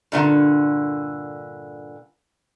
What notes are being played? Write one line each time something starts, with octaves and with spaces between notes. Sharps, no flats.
G2 A#2 D3